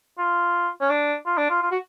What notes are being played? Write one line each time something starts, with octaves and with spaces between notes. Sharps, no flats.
F4
C#4
D4
F4
D4
F4
F4
F#4